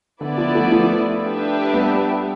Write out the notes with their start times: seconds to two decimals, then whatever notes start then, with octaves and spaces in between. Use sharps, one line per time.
0.21 D3 B3 E4 B4 D5
0.38 D3 F3
0.55 F3 A3
0.72 F3 A3
1.23 D4 G4 B4 E5
1.74 G3 B3